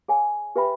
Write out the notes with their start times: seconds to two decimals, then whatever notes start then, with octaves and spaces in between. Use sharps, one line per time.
0.08 G#4 C#5 F5 G#5
0.56 G4 B4 E5 G5 B5